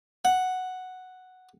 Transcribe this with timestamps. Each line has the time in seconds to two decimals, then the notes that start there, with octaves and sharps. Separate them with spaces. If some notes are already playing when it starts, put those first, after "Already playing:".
0.25 F#5